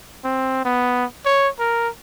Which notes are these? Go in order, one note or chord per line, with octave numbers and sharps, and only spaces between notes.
C4
B3
C#5
A#4